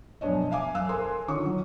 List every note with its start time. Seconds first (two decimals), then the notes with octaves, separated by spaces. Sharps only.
0.21 F#2 B2 F3 D4 C#5 D#5
0.51 E5 F5 G#5 D6
0.74 F#2 F5 E6 F#6
0.89 A4 A#4 C5 G#5 C6
1.28 D3 D#3 C#4 F4 C#6
1.46 F#3